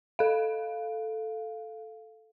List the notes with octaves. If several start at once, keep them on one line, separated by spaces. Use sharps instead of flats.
A4 F5